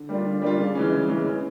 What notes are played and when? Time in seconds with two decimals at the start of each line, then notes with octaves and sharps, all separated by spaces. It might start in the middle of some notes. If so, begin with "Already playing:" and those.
Already playing: D3
0.09 G3 A#3 D4 F4
0.26 D3
0.42 G3 A#3 D4 F4
0.58 C#3
0.75 E3 G#3 C#4
0.92 C#3
1.08 E3 G#3 C#4
1.25 E3